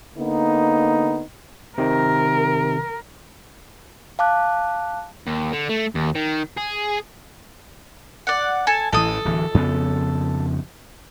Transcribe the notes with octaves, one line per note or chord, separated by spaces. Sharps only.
D3 A#3 B3 D#4
C3 D#3 A#4
F5 A5 D6 F#6
D#2
D3
A3
D#2
D#3
G#4
D5 F#5
A4 G#5 A5
A1 E3 A4 D#6
D1 E3
F2 C#3 B3